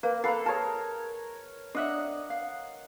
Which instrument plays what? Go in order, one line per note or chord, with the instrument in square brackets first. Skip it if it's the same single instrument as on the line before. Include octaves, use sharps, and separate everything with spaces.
[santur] A#3 A#4 [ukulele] B4
[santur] A4 B4 [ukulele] F5 A#5
[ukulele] G#4 A5 [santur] A#4 C#5
[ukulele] D4 E5 [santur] D#5 F#5
[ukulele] F5